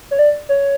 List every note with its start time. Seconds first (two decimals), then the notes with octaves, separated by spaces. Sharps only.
0.11 C#5
0.19 D5
0.49 C#5